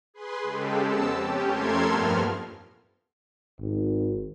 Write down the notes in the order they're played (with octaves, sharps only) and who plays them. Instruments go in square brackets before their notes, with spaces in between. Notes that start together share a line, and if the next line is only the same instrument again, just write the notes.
[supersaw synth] G#4 B4 C6
C#3 G#3 G4 A4
F2 B3 C4 A5 E6
C#4 G4
F2 A3 A4 A#4 C6 G#6
G2 A#2 F3 B3 F6
[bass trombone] G#1